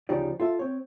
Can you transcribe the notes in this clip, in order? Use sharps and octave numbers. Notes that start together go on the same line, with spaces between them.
D2 C#3 F3 D#4 G4 D5
F4 A4 E5
C4 C#5